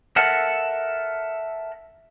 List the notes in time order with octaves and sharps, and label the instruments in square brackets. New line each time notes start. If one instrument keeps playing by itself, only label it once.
[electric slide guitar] A4 A#4 E5 F#5 A5